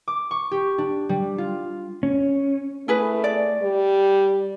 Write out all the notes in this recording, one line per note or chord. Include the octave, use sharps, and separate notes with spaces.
D6
C#6
G4
D4
G3
F4
C#4
A3 E4 G#4 B4
D5
G3